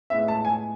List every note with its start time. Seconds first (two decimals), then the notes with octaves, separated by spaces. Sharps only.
0.10 A2 G#3 B3 E5
0.28 A5
0.45 G#5